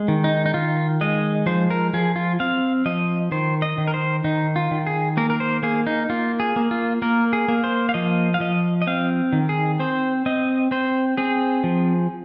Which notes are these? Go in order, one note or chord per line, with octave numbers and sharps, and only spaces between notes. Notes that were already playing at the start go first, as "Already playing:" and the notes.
Already playing: G#3
D#3
D#4
D#4
D#3 F4
G#3 D#5
F3 C5
A#4
F3 G#4
F4
C4 F5
F3 D#5
D#3 C5
D#5
D#3
A#4
C5
D#3 D#4
F4
D#3
G#4
A#3 A#4
A#4
C5
A#3 G#4
D#4
A#3 F4
G#4
A#3
F4
A#3 A#4
G#4
A#3
C5
F5
F3 D#5
F5
F3 D#5
D#5
C4 F5
D#3
G#4
C4 C5
C4 D#5
C4 C5
C4 G#4
F3